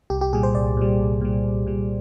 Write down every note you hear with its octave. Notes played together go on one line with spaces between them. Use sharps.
C2 G4
G4
A#2 G3 G#4
C5
C2 D5
A#2 G3
C2
A#2 G3
C2
A#2 G3